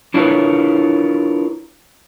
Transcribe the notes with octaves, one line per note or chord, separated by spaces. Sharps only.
D4 E4 F4 A#4 B4 C#5